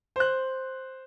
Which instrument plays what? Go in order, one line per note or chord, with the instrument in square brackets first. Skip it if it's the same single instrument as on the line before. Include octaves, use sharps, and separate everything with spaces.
[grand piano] C5 F#6